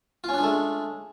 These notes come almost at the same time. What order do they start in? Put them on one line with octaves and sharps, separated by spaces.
F4 C#4 D4 G#3 A3